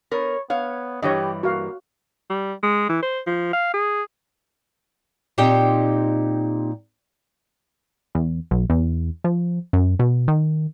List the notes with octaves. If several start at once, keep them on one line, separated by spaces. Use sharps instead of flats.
B3 A#4 C#5
B3 C#5 F5
G2 E3 G3 G4 C#5 D#5
A#3 F#4 F5
G3
G#3
E3
C5
F3
F5
G#4
A#2 C4 D#4 G4 D#5 G5
E2
B1
E2
F3
F#2
B2
D#3